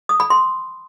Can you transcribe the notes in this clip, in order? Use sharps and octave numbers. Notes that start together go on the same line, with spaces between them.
D#6
B5
C6